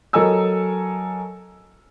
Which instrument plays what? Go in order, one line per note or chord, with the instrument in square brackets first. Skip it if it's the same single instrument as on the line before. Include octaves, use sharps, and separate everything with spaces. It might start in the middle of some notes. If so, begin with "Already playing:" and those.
[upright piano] F#3 A4 A#4 D#5 G#5 E6